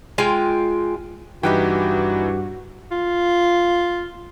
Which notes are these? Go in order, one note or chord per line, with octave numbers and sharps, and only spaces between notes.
G#3 F4 G5 G#5
G2 E3 D#4 E4 F#4 G4 B4 G5
F4